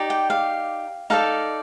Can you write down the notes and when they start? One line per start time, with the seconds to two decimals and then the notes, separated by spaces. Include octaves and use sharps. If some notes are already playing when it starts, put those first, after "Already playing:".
Already playing: D#4 G4 D5
0.10 G5
0.30 F5
1.10 D#4 A4 D5 F5